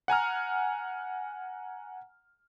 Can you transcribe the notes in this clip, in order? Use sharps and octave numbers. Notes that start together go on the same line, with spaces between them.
F#5 G#5 A#5 F6